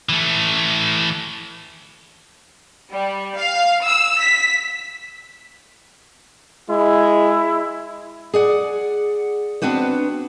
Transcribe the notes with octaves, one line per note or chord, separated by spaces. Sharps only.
E3 A3
G3
F5
E6
B6
G#3 E4
G#4 D5 F#5
B3 C4 D4 F#4 B4 C5